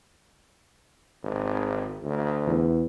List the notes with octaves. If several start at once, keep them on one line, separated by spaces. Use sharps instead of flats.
G#1
D2
E2